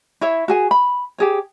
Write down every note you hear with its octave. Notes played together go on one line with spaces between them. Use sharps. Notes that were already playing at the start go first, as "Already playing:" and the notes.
E4 C#5 E5
F#4 G#4 G#5
B5
G4 G#4 C#5